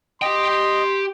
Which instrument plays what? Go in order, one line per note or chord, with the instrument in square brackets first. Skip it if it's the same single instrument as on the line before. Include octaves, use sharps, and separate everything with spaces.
[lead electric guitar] G4 G5 [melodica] D#5 [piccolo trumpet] C6